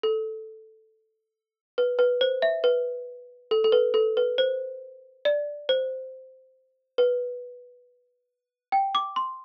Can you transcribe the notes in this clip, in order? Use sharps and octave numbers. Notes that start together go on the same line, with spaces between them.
A4
B4
B4
C5
E5
B4
A4
A4
B4
A4
B4
C5
D5
C5
B4
G5
D6
C6